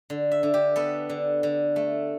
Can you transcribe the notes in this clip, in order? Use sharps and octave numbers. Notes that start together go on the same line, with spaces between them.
D3
E5
D3
G4
B3 A4
D3
D3
A3